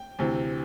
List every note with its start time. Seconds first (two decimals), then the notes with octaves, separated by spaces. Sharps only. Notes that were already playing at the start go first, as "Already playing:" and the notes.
Already playing: G5
0.19 D2 C3 E3